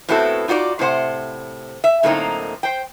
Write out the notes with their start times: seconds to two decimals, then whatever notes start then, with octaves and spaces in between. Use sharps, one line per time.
0.09 A2 B3 C4 E4 F#4 A4
0.48 D#4 F4 F#4 C5 D5
0.79 A2 C3 C5 F#5
1.84 E5
2.03 F#2 A2 D3 A#3 C4 D#4
2.63 C5 G5